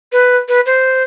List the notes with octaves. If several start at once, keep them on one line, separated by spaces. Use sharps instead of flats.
B4
B4
C5